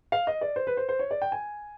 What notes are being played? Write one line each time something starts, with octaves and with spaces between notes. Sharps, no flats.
F5
D#5
D5
C5
B4
C5
C5
C#5
D5
G5
G#5